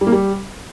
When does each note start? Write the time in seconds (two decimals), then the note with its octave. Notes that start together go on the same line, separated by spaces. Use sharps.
0.01 G3
0.07 A#3
0.12 G3